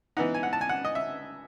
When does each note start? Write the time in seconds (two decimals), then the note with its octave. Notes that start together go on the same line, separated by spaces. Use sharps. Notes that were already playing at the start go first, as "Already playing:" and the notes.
0.17 E3 B3 D#4 F#5
0.34 G#5
0.43 F#5
0.53 A5
0.61 G#5
0.69 F#5
0.85 D#5
0.95 E5